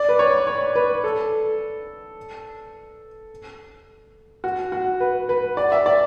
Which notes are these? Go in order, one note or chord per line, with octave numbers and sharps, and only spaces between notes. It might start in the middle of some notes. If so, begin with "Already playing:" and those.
Already playing: D5
B4
C#5
C#5
B4
A4
F#4
F#4
B4
B4
D5
E5
D5